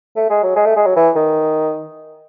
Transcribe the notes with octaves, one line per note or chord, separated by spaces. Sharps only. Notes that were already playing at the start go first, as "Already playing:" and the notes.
A3
G#3
F#3
G#3
A3
G#3
F#3
E3
D#3